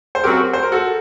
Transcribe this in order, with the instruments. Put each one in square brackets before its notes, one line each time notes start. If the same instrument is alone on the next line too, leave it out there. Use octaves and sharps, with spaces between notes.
[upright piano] C5
[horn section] F#2 F#3 C4 F#4 [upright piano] G4 A#4
[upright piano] C5
A#4
F#4 A4